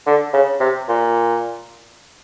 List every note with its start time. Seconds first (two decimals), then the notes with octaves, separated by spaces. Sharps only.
0.07 D3
0.34 C#3
0.60 C3
0.89 A#2